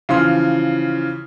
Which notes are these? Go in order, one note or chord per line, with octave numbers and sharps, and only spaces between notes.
C#3 E3 F3 C6 F6